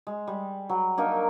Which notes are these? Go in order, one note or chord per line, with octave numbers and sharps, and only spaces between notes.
G#3
G3
F#3
A#3 D4 D#4 A#4